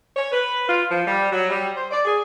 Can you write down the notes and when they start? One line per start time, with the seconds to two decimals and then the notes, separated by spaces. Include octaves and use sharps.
0.17 C#5
0.32 B4
0.69 F4
0.90 F3
1.07 G3
1.32 F#3
1.50 G3
1.76 C5
1.91 D5
2.05 G#4